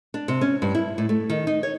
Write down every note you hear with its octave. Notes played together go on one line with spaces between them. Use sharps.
D4
C3
C#4
G2
E4
A2
A3
D#3
D#4
C#5